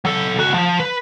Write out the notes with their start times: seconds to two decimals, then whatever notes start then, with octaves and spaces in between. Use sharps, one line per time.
0.05 F#3 A4
0.39 C#2 F#4
0.54 F3
0.80 B4